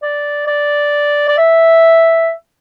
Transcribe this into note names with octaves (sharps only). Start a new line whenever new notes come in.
D5
D5
D5
E5